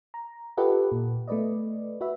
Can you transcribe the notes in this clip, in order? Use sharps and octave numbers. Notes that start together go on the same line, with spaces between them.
A#5
F4 G4 A4 B4 D#5 F#5
A#2
A3 B3 B4 D5 D#5
F#4 B4 E5